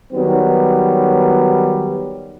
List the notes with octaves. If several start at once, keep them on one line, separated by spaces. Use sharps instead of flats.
D#3 F#3 G3 B3